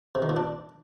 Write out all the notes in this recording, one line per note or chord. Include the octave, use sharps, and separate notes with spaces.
C3
D#3
A#2
D4